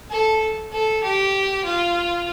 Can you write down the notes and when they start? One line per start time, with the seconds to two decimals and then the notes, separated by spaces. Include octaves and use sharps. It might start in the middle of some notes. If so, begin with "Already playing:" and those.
0.11 A4
0.73 A4
1.03 G4
1.65 F4